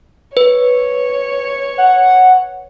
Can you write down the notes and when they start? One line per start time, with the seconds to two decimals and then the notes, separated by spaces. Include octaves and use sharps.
0.37 B4 C#5
1.78 F#5